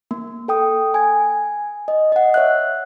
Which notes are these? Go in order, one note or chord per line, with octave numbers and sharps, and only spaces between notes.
A#3
A4 G5 D#6
G#5 G#6
D#5
D#5 F#5
C#5 E5 F#6